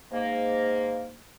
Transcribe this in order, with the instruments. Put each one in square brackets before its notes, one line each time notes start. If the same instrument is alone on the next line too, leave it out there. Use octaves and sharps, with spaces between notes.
[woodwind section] G#2 A#3